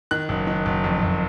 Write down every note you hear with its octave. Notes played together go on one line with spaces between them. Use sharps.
D#3 F#6
F#1
D#3
F#1
F2
F#1